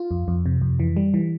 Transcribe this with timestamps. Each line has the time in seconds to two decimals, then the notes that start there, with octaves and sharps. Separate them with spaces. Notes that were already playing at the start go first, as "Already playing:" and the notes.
Already playing: F4
0.11 F2
0.28 F2
0.46 C3
0.62 F2
0.80 E3
0.97 G3
1.14 E3